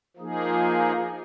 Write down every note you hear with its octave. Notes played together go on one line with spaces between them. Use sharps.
F3 A#3 D#4 G#4